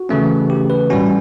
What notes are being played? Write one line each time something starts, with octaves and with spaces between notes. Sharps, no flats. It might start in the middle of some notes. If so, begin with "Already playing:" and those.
Already playing: F#4
C#3 E3 A3 C#4
G4
B4
A2 G3 C#4 F#4